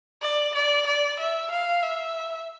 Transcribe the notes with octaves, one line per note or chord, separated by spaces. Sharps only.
D5
D5
D5
E5
F5
E5